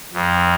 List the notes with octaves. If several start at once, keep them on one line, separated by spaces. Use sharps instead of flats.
F2